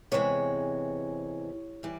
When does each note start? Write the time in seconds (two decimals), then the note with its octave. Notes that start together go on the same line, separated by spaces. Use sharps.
0.12 E2 C3 E3 G#3 C#5
1.83 E3 G3